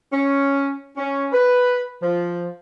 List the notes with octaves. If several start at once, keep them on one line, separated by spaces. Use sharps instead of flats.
C#4
C#4
B4
F3